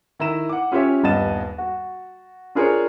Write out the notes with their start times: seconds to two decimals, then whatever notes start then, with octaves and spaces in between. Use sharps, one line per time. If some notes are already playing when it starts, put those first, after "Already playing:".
0.19 D#3 E4 A#5 E7
0.49 F#5 D6
0.72 C#4 F4 G4 C#5 E5 G#5
1.03 D#1 G2 B3 D#5 A6 E7
1.58 F#4
2.55 D4 F4 G#4 A#4 C5 C#5